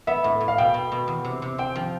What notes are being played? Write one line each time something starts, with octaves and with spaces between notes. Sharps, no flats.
B3 E5
A2
A2
F5
B2 G5
B2
B2
E2
C3
C3
C4 G5
F3